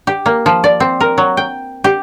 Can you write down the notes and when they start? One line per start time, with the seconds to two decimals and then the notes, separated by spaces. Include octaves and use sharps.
0.07 G4
0.26 A#3
0.46 F3
0.64 D5
0.80 C4
1.00 A#4
1.18 F#3
1.37 G5
1.84 G4